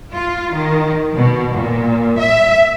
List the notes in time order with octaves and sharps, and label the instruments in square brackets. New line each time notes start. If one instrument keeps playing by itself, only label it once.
[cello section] F4
D#3
B2
A#2
E5